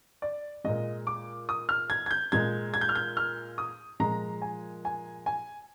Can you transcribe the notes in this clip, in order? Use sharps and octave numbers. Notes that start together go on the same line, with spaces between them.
D5
A#2 G#3 D#5
D6
D#6
F6
G#6
G#6
G6
A#2 G#3 G#6
G#6
G6
F6
G6
F6
D#6
A#2 F3 G#3 A#5
G#5
G#5
G#5